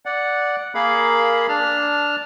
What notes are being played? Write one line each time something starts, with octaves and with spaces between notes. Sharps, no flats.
D5 F#5
A#3 G#4 A#4 F5 B5
D4 A5 F6